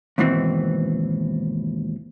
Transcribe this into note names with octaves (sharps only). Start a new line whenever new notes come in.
D#2 G#2 B2 E3 C4